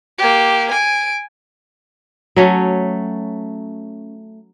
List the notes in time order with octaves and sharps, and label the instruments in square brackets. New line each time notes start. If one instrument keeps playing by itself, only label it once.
[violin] A#3 G4
G#5 D7
[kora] F#3 A3 C#4